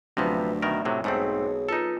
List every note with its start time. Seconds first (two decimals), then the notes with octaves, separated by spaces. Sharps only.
0.17 D2 C3 F3 F#3 B3 B4
0.62 B2 D#3 A#4 E5
0.85 A2 C3 F#3
1.04 B1 G#2 A3 C4 D#4 G#4 C#5
1.69 D#4 F4 A4 B4